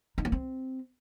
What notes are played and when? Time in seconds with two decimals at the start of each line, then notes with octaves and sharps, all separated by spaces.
0.18 D#4
0.25 A#3
0.32 C4